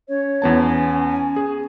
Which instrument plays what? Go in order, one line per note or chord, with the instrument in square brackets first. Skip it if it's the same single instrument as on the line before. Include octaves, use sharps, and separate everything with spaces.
[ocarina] C#4 [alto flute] C#5
[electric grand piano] E2 B3 A5
[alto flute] G#5
[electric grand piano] G#4